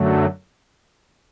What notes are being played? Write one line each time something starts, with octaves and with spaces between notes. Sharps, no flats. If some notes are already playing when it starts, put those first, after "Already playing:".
Already playing: F#2 D3 F#3 A3